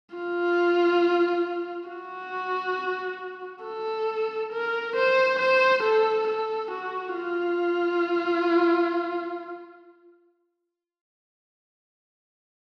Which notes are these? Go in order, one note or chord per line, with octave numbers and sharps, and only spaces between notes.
F4
F#4
A4
A#4
C5
C5
A4
A4
F#4
F4